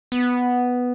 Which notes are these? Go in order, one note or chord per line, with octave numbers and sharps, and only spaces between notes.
B3